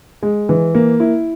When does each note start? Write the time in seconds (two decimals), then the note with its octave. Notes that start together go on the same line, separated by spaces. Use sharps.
0.23 G#3
0.49 E3
0.75 A#3
1.00 E4